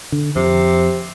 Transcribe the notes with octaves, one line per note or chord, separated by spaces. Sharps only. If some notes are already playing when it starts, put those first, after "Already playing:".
D3
F2 C3